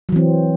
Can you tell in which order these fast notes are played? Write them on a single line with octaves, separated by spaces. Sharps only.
F#3 E3 C4